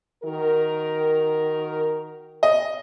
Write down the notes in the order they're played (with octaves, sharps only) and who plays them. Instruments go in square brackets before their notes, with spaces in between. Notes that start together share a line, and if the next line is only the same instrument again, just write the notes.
[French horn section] D#3 F#4 A#4
[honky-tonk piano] D#5